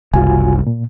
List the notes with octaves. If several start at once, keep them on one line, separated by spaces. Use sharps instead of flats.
F#1 C2 F4 F#4 G#5
A#2